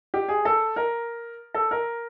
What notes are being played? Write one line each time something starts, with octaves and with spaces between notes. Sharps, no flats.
G4
G#4
A4
A#4
A4
A#4